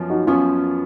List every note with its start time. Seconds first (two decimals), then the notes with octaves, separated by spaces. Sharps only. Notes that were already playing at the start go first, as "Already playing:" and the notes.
Already playing: F#2 F3 B3
0.10 D#4 F#4
0.26 F#2 F3 B3 C#4 F4